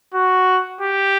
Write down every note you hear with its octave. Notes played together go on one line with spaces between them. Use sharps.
F#4
G4